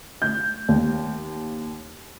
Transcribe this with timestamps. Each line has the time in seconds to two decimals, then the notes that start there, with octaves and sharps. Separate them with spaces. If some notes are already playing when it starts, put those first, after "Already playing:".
0.22 G6
0.68 D#2